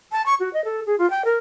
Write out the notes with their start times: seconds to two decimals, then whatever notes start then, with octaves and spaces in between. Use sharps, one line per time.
0.12 A5
0.26 C#6
0.40 F#4
0.53 D#5
0.65 A4
0.86 G#4
0.98 F4
1.10 G5
1.25 A#4